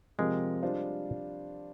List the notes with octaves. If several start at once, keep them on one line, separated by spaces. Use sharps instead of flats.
C3 F3 G#3 C4 G4 A#4
G3 D4 F4 C5